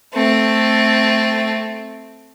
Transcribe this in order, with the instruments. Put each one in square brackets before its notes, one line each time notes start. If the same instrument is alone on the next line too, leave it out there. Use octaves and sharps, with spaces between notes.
[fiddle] A3 C4